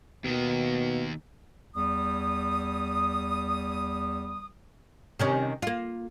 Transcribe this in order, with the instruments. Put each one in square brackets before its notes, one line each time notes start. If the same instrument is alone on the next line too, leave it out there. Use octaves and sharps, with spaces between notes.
[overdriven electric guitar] D#2 D#3 [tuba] B2
[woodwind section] E2 G3 D#6
[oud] C3 D#3 C#4
A#3 F4